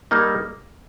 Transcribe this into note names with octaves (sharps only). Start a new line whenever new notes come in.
G3 A#3 D#4